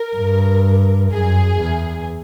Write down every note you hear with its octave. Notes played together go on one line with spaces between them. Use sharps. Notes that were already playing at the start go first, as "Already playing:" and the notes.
Already playing: A#4
G2
F#2 G#4
E2